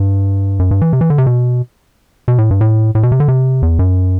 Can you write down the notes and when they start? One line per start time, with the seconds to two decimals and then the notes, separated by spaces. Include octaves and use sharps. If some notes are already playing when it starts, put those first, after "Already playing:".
Already playing: G2
0.59 F#2
0.71 G2
0.81 E3
0.93 C3
1.01 E3
1.10 D3
1.18 C3
1.26 B2
2.28 B2
2.38 A2
2.51 G2
2.61 A2
2.95 A2
3.03 B2
3.12 C3
3.20 D3
3.28 C3
3.62 E2
3.79 F#2